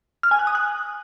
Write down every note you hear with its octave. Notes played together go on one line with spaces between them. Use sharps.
F6
G#5
F#6
D#6
F#6